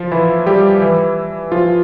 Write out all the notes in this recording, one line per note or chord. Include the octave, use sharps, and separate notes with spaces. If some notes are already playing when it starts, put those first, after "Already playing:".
Already playing: F3 F4
E3 E4
G3 G4
E3 E4
F3 F4